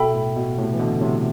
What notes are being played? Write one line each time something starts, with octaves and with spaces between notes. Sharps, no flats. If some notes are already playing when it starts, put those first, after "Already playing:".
Already playing: B2 A4 E5 G5 B5
A2
B2
A2 C3
E3
B2 D3
A2 C3